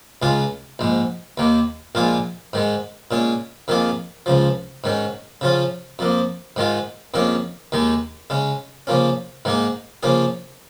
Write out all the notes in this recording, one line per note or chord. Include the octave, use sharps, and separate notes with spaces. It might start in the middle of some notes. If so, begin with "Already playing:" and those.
C#2 C#3 G#3 F4 G#4
A#1 G#2 G#3
D#2 D#3 A#3
A#1 A#2 G#3 F4 G#4
G#2 D#3 G#3
A#2 G#3 C#4 G#4
F2 D#3 A#3 F4 G#4
C#2 C#3 F3
G#2 D#3 C#4
C#3 F3 C#4 F4
F2 F3 A#3
G#2 D#3 G#3 F4
F2 D#3 A#3 C#4 G#4
D#2 D#3 G#3 D#4
C#3 G#3 C#4
C#3 F3 A#3 C#4
G#2 D#3 A#3 D#4 G#4
C#3 F3 A#3 C#4 G#4